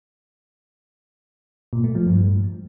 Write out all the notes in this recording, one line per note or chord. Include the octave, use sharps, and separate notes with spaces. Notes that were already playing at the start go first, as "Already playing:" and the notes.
A#2
A3
F3
G2